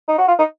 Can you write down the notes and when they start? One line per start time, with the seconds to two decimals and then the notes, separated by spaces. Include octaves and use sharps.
0.08 D#4
0.18 F#4
0.28 F4
0.38 D#4